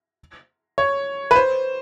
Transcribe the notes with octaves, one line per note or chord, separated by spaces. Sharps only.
C#5
B4
C5